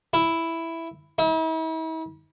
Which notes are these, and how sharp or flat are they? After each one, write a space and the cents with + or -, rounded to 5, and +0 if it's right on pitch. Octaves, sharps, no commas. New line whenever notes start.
E4 +0
E4 -45